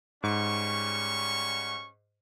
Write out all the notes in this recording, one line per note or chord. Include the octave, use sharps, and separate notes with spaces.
G#2 G3 C#4 C#6